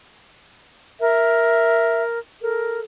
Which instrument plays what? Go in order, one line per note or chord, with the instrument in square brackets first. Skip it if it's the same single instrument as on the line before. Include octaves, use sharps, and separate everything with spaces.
[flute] A#4 [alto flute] E5
[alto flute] A4 [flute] A#4